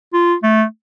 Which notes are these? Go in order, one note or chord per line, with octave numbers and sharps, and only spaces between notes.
F4
A3